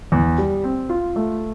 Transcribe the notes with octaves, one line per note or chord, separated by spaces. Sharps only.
E2
G3
C4
F4
A3